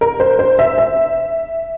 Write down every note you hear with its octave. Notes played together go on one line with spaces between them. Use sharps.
A#4
C5
C5
E5
E5